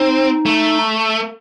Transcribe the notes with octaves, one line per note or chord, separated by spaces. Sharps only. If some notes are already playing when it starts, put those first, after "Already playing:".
Already playing: C4 D#4
A3